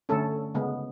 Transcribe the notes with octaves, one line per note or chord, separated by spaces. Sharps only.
D3 A3 C#4 A4
C#3 G#3 B3